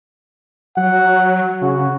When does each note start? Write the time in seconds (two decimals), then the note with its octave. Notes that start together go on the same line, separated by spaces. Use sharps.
0.77 F#3 F#5
1.62 C#3 F#4